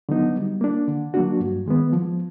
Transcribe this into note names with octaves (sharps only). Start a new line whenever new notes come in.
D3 F#3 B3 D#4
G3
A#3 D4
D3
F#3 A#3 D4 F#4
G2
D#3 G#3 B3
F3